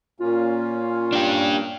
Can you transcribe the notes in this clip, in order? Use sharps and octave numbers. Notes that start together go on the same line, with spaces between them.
A#2 A#3 C#4 F4
D4 G4